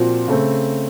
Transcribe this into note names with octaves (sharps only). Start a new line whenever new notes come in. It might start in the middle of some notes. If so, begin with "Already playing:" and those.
Already playing: A#2 F3 C4 F#4
C#3 A3 C4